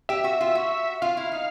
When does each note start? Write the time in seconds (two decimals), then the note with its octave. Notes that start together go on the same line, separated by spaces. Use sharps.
0.09 G4 E5
0.24 F#4
0.41 F4
0.55 F#4
1.02 F4 F5
1.17 E4
1.32 D#4